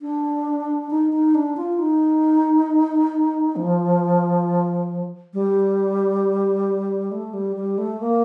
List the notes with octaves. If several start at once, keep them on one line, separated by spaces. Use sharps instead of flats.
D4
D#4
D#4
D4
F4
D#4
F3
G3
A3
G3
G3
A3
A#3